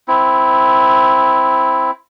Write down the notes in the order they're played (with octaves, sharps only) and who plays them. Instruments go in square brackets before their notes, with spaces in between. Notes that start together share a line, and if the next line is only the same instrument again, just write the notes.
[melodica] C4 E4